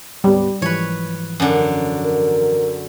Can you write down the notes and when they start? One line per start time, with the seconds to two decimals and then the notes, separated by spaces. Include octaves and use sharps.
0.24 D2 G#2 G3 B3
0.62 G#2 E3 F3 B4 C#5
1.40 F#2 D3
2.04 A#4